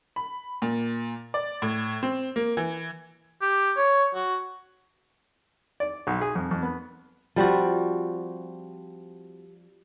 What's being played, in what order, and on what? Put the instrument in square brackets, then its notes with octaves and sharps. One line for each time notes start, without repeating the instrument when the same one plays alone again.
[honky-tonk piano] B5
A#2
D5
A2
C4
A#3
E3
[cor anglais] G4
C#5
F#4
[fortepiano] D5
B1
G#4
F2
F2
B3
[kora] F3 G3 C4 F#4